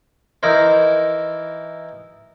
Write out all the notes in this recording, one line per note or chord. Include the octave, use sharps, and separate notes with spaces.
E3 D#4 E4 A#4 C5